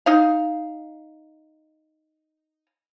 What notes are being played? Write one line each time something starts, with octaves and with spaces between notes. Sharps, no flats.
D#4 F5